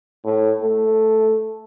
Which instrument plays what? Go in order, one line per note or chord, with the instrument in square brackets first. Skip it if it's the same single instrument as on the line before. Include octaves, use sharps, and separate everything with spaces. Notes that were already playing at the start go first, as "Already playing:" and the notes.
[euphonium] A2
A3